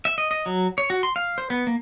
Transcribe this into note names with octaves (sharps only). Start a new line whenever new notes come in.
E5
D#5
D#5
F#3
C#5
F#4
C6
F5
C5
B3
A#3